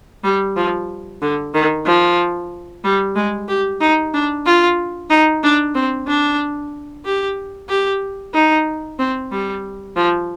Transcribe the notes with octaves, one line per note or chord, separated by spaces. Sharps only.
G3
F3
D3
D#3
F3
G3
G#3
G4
D#4
D4
F4
D#4
D4
C4
D4
G4
G4
D#4
C4
G3
F3